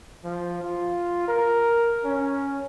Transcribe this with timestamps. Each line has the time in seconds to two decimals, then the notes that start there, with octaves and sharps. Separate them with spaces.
0.24 F3
0.63 F4
1.28 A#4
2.04 C#4